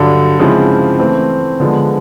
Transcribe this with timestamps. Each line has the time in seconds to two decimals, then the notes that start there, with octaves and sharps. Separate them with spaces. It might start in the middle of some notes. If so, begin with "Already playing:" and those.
Already playing: G2 D3 F#3
0.40 C#3 F3 G#3 C4 E4
0.99 E3 A3 C4
1.60 D3 F3 G#3 B3